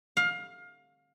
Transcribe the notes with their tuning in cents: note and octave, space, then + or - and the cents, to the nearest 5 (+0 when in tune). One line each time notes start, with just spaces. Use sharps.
F5 +25